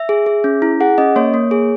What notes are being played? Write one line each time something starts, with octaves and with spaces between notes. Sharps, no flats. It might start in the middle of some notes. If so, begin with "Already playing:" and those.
Already playing: E5
G#4
G#4
C#4
E4
G#4 F#5
C#4 D#5
A#3 C#5
A#3
G#4